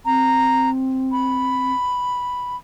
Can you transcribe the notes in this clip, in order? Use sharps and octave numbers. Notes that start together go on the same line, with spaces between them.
C4 A#5
B5